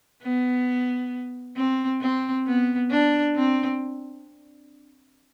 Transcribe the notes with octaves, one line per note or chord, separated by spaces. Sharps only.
B3
C4
C4
B3
D4
C4